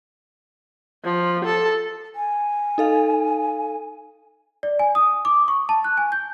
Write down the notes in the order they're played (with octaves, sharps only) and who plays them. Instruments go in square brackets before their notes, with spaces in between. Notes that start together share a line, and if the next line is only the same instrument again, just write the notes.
[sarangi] F3
A4
[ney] G#5
[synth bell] D#4 A4 F5
[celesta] D5
G#5
D#6
D6
C#6
A5
F#6
G#5
G6